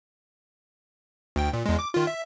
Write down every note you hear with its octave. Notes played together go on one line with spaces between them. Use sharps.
D2 G5
A#2
E2 G#3
D6
D#3 F4
E5